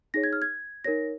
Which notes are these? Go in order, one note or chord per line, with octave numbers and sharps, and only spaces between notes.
D#4 G#4 C#5 A#6
G#6
F6
G#6
D#4 A#4 C#5 A#6